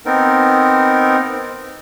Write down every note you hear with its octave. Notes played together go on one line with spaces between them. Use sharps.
B3 C4 D#4 A#4